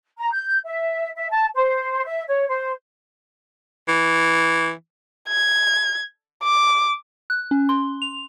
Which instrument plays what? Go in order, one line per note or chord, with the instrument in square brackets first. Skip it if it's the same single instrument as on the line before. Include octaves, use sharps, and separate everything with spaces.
[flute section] A#5
G6
E5
E5
A5
C5
E5
C#5
C5
[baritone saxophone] E3
[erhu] G#6
D6
[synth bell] F#6
C#4
C6
F7